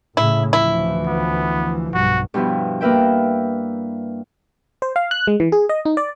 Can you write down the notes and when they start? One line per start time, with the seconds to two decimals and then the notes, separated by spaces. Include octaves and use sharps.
0.17 A2 C#3 E4
0.53 D2 E3 F3 E4
1.07 B3
1.94 B1 G2 F#4
2.34 G2 B2 F3 E4
2.81 A#3 A#4 B4 E5 G5
4.82 C5
4.96 F5
5.11 F#6
5.27 G#3
5.40 E3
5.52 G#4
5.69 D#5
5.85 D#4
5.97 D5